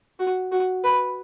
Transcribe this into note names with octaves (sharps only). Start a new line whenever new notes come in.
F#4
F#4
B4